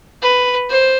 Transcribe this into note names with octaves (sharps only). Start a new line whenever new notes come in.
B4
C5